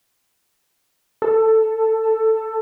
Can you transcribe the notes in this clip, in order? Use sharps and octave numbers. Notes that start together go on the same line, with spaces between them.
A4